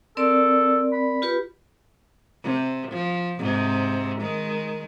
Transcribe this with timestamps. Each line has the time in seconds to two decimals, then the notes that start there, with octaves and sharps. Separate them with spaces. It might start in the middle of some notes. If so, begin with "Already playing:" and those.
0.17 C4 A4 A#4 D5
0.93 B5
1.22 F4 G4 B4
2.43 C3
2.91 F3
3.38 G#2 C3
4.21 D#3 G#3